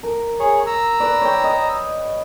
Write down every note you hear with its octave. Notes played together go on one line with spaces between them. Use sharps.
A#4
G#4 C#5
A#5 E6
B4 D5
C#5 G5
D#5